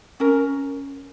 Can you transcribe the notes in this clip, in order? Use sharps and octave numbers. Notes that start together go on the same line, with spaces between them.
C#4 A#4